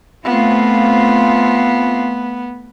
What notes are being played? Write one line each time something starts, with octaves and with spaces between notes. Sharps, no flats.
A3 B3 C4 F4